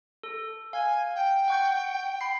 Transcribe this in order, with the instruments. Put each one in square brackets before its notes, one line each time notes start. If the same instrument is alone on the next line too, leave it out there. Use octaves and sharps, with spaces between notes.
[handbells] A4
[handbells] F5 [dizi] G#5
[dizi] G5
[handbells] F#5 C#6 G6
B5 C7